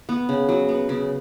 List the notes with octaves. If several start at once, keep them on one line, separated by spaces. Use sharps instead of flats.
B3
C#3
F#3
B3
C#3